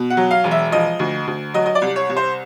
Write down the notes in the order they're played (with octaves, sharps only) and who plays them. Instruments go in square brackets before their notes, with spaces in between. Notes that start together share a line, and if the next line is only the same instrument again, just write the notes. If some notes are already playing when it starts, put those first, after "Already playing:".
Already playing: [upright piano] B2
F#5
F#3
F5
E1
E5
F3 D#5
D2
D2
F#3 D#5
D#5
D5
C2
C#5
C2
C5